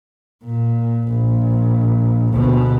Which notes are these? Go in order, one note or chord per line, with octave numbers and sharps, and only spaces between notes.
A#2
A#1
D2 B2